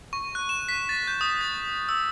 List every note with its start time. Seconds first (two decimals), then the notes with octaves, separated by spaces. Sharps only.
0.13 C#6
0.35 F#6
0.49 E7
0.69 B6
0.89 A6
1.08 G6
1.21 D#6
1.41 A6
1.89 E6